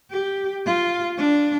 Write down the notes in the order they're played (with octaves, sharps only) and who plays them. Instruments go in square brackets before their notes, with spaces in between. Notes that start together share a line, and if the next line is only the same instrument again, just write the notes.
[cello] G4
F4
D4